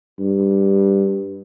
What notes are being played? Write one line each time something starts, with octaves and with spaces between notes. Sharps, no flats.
G2